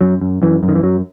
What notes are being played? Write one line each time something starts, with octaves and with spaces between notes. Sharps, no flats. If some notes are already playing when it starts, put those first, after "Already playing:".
F#2 F#3
F#2
F#2 E3
F#2
D#3
E3
F#2 F#3